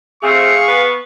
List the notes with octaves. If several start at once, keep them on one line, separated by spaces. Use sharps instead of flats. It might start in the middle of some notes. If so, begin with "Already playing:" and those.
F3 A3 C4 G#4 F5 C#6
B3 B4